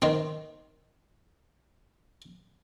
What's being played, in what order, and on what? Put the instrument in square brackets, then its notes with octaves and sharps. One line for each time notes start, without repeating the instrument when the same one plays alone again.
[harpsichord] D#3 C4